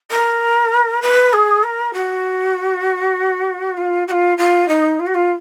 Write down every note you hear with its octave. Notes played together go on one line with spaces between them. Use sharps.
A#4
B4
G#4
A#4
F#4
F4
F#4
F4
F4
D#4
F4
F#4
F4